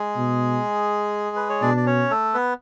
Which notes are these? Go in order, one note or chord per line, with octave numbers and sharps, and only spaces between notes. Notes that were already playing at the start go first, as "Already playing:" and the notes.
Already playing: G#3 G#4
B2
B4
C#5
B2 D4 D5
D5
C#4 C#5
A3 A4
B3 B4